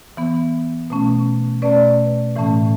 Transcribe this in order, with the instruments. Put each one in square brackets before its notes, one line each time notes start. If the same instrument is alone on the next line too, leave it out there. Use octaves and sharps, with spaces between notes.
[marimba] E3 B3
B2 A3 C#4
B2 A3 C#4 B4 D5
A2 E3 A3 C#4